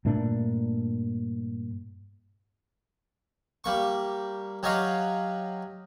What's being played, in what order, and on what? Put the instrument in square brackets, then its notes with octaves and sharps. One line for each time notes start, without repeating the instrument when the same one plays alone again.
[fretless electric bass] G2 A#2 A3 D4
[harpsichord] G3 A#3 C#6
F#3 G4 C#5 D#5 F5